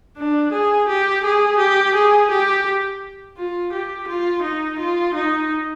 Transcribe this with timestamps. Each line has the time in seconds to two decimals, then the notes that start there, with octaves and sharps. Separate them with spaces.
0.17 D4
0.53 G#4
0.88 G4
1.24 G#4
1.59 G4
1.95 G#4
2.30 G4
3.37 F4
3.73 G4
4.08 F4
4.43 D#4
4.79 F4
5.14 D#4